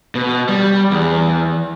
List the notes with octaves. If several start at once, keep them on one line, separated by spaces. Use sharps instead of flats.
B2
G3
E2